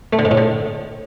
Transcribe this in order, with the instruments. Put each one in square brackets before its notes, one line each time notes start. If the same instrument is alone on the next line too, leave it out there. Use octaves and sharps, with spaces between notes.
[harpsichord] A3
D3
G#2
A2
D3